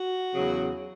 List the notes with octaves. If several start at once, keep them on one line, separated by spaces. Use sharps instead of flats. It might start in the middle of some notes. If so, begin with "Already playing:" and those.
Already playing: F#4
E2 C#3 F#3